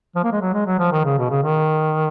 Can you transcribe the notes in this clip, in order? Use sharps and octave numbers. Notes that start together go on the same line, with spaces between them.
F3
A#3
G#3
F#3
G#3
F#3
F3
D#3
C#3
B2
C#3
D#3